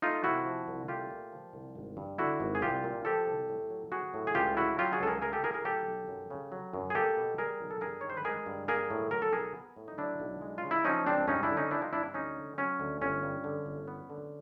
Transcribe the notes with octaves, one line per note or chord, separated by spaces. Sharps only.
A3 D#4 F4
C3 E4 F#4
F3
C2
A3 F4 G4
A#2
F3
C2
G#1
G2
D3 E4 F#4
G#1
G#4
C2 F4 G4
A#2
F3 G4 A4
C2
A2
F#3
B3 F#4 G#4
A2
G#4
C#2 F4 G4
C#3 E4 F#4
F#3 F4 G4
F#4 G#4
C#2 A4
G#4 A#4
A3 G#4 A#4
G4 A4
A2 G#4 A#4
G#4 A#4
F#3 G4 A4
B1
F#2
C#3
F#3
F#2
G#4
A#3 G4 A4
B2
G3 G#4 A#4
B1
A4
G2 G#4 A#4
D#3 C#5
C5
B4
G#3 G#4 A#4
G2
A#3 G#4 A#4
A2
F#3 A#4
A4
B1 G#4 A#4
B3
A2
D#4
F#3 D4 E4
B1
G#3
C#3 F4
E4
F3 C#4 D#4
C#2 C4 D4
G2 C#4 D#4
D4 E4
D3
C#4 D#4
G3 D4 E4
D#4 F4
G2 D4 E4
D2 C#4 D#4
D3
F#3 C#4
D2
G1 C#4
G2
D3
G1
B3
D3